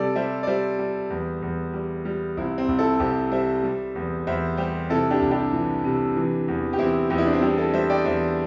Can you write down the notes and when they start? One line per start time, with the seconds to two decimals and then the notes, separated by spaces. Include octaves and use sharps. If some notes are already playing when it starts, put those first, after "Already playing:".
Already playing: C3 G3 A4 D5
0.15 G3 C5 E5
0.43 D5
0.47 G3 C5 E5
0.79 G3
1.10 E2
1.42 E2
1.73 G3
2.05 G3
2.37 C2 C4 E4
2.58 C4
2.68 C2
2.79 E4 A4
3.00 C2 G4 C5
3.31 G3 C5 E5
3.63 G3
3.95 E2
4.27 E2 C5 E5
4.57 G3 G4 C5
4.90 C3 E4 A4
5.11 D4 G4
5.22 C2
5.31 D4 G4
5.53 E3
5.84 C3
6.16 E3
6.48 E2
6.73 G4
6.78 E2 C4 E4
7.10 E2 G4
7.18 E4
7.26 D4
7.33 C4 E4
7.42 G3 D4 G4
7.57 E4 A4
7.73 G3 C5 E5
7.90 D5 G5
8.05 E2 C5 E5